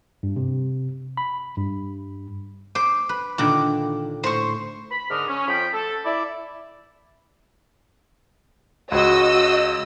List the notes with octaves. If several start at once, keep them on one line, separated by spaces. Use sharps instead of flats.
G2
C3
B5
G2
C5 D6
B4
A#2 D3 D#3 D6
A2 C5 C#6
B5
G#2 D3 D4 A#4 D#6 F6
C#4
F2 F3 G5 B5
A4
E4 D5
C#2 F#4 D#5 E6